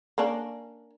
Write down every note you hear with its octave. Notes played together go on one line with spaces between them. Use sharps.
A#3 C#4 D4